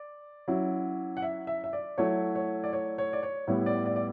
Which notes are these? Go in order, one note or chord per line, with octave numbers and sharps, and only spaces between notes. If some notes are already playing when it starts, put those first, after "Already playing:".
Already playing: D5
F#3 C#4 E4
F#5
E5
E5
E5
D5
F#3 A3 E4 C#5
C#5
D5
C#5
C#5
D5
C#5
A2 G3 B3 E4 C#5
D5
D5
D5